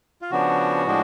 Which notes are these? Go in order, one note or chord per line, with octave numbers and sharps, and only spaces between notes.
F4
C#3 F3 B3 D4 F#4
A2 F3 G#3 D4